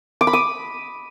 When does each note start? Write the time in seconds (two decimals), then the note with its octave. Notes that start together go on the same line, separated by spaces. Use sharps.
0.21 D6
0.27 B5
0.33 D#6